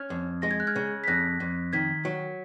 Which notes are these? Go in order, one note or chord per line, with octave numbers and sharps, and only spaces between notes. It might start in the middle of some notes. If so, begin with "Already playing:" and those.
Already playing: C#4 F6 G#6
F2
G#3 A#6
G#6
F#6
F6 G#6
C#3
B6
F2 F#6 A#6
F2
D#3 G#6 B6
F#3